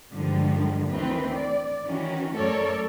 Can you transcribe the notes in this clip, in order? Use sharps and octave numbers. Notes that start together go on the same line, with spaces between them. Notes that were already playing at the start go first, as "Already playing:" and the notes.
G2 D3 D#3 F3 G#3
D2 D#3 E3 C4 B4
D5
D#3 E3 C#4 F#4
F#2 A3 A4 A#4 C#5 D5